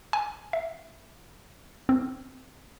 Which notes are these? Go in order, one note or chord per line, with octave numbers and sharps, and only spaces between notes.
G#5
E5
C4